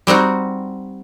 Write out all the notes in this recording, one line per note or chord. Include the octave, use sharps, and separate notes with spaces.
G3 C4 D#4 F#4